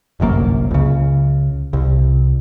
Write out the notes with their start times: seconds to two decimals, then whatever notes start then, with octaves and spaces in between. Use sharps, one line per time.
0.20 G1 C2 F#2 A#3
0.71 C#2 C#3
1.73 C2